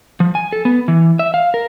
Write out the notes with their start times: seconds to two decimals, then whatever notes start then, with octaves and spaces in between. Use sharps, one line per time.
0.20 F3
0.35 G#5
0.53 A4
0.65 B3
0.88 E3
1.19 E5
1.34 F5
1.54 A#4